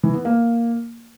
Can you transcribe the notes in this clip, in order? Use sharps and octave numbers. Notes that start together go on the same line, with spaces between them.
E3
B3
A#3